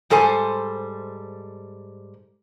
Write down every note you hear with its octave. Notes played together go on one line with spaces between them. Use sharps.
G#2 G3 A4 C5 G#5